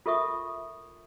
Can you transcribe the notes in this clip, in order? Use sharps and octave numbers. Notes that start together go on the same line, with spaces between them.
F4 A4 A#4 E5 C#6 D#6